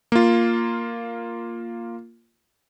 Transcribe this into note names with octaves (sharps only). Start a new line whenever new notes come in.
A#3 F4